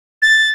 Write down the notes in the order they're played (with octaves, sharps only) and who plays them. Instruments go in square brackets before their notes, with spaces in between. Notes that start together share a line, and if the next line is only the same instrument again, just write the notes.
[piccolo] A6